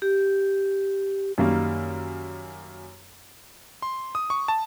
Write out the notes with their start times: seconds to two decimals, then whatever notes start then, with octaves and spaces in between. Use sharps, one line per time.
0.02 G4
1.38 F#2 D#3 G3 A#3
3.82 C6
4.15 D#6
4.30 C#6
4.48 A5